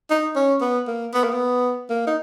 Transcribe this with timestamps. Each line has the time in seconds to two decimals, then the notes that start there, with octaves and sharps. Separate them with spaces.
0.10 D#4
0.36 C#4
0.61 B3
0.88 A#3
1.14 B3
1.24 A#3
1.34 B3
1.90 A#3
2.07 D#4